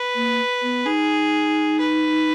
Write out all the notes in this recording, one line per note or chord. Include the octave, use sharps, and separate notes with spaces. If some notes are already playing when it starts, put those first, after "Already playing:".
Already playing: B4
A#3
B3
D#4 G#4
B4